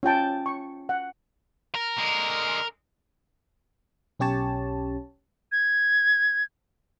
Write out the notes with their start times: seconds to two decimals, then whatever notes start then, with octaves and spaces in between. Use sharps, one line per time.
0.03 C#4 F4 G5 A5
0.46 C#6
0.89 F#5
1.75 A#4
1.98 D3 G#3
4.20 B1 C#4 G4 C#5 A5
5.52 G#6